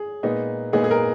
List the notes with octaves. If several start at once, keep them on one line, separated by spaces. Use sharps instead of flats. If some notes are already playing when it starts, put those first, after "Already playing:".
Already playing: G#4
A#2 G#3 B3 D#4
A#2 G#3 B3 D#4 G#4
G#4
A#4